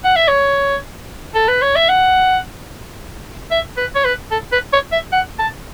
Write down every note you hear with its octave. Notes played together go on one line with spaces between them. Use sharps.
F#5
E5
C#5
A4
B4
C#5
E5
F#5
E5
B4
C#5
B4
A4
B4
C#5
E5
F#5
A5